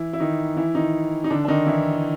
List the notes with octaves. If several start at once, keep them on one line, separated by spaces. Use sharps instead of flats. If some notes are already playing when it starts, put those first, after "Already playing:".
Already playing: E3 E4
E4
D#3 D#4
E3 E4
D#3 D#4
D#4
D3 D4
D4
D#3 D#4
E3 E4